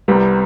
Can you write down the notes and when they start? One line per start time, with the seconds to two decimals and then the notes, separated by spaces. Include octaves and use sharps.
0.08 C2 C3 G3 B3